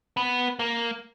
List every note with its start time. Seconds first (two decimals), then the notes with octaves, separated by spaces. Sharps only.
0.17 B3
0.59 A#3